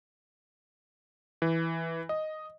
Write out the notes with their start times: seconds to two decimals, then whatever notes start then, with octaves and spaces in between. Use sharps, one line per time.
1.42 E3
2.09 D#5